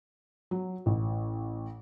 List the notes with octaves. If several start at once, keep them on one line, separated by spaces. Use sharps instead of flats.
F#3
A1